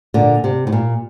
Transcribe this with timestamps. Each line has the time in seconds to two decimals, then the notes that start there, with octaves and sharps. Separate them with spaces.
0.14 A#2 D3
0.44 C3
0.67 A2
0.72 A#2